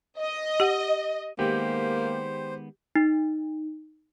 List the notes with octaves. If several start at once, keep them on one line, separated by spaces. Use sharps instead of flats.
D#5
G4 F#5
D#3 G#3 A#3 B3 G4 C5
D#4